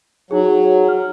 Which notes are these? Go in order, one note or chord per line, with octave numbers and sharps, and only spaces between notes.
F#3 D#4 G#4
F6